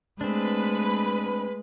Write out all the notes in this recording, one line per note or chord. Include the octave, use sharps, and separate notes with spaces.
G#3 A3 C4 D4 B4